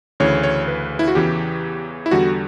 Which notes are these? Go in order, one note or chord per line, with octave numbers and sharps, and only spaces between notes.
D2 C#3 E3 C#5
C#5
B4
E4
F#4
E2 C#3 E3 G4
E4
E2 D3 G3 F#4